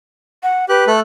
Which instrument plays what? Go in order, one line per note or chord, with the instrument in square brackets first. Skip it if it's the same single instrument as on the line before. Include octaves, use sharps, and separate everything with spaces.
[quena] F#5
[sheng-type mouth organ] G4 F#6 [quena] B4
[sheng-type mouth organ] A3 A4 F#6